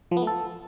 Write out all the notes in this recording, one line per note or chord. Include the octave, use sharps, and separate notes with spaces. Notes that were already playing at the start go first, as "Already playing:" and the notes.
F3
B3
A3
A4